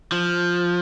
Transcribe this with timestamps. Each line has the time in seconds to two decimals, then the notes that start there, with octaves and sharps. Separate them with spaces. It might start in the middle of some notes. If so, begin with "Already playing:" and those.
0.12 F3